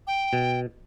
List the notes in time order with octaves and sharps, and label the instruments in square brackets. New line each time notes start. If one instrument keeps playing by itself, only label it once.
[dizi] G5
[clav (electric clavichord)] B2